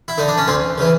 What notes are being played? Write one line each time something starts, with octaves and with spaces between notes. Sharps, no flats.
E4
D3 D#4
D4
C#4
D2 C4
C#3 E3